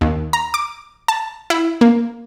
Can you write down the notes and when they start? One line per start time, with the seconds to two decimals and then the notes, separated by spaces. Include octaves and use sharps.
0.01 D#2
0.33 A#5
0.54 D6
1.08 A5
1.50 E4
1.81 A#3